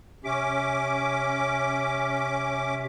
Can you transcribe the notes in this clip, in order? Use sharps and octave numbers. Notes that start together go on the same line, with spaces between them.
C3 C#4 E5 D6